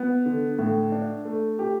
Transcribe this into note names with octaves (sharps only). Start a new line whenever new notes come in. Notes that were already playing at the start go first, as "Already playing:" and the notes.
Already playing: B3
D3
A2
D4
A3
G4